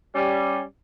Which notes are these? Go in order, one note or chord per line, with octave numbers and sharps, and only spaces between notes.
G3 C#4